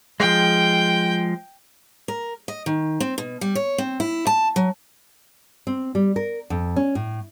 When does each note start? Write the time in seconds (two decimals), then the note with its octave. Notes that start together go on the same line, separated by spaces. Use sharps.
0.20 F3 G#3 G5
2.08 A#4
2.48 D#5
2.66 D#3
3.00 C4
3.18 B2
3.41 G3
3.55 C#5
3.78 C4
4.00 E4
4.27 A5
4.56 F#3
5.67 C4
5.95 G3
6.16 A#4
6.50 F2
6.76 C#4
6.95 A2